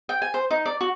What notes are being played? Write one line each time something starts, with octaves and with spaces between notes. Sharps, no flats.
G5
G#5
C5
D#4
D5
F#4